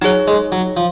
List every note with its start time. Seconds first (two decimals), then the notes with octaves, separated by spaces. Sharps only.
0.01 F#3 D#4 G#4 C#5
0.28 G#3
0.52 F#3
0.77 F3